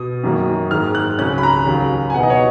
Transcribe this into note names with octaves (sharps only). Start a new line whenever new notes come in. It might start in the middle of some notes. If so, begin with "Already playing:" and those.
Already playing: B2 D#6
F#2 D#3 F#3 A#3 C#4
G#2 D#3 G#3 F6
F#6
C#2 C#3 F#3 C#4 F#6
B5
A#5
D#2 C#3 F#3 C#4
G#5
B2 F#3 B3 D#4 F#5
D#5
C#5